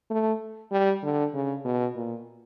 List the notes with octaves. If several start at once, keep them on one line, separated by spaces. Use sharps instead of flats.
A3
G3
D3
C#3
B2
A#2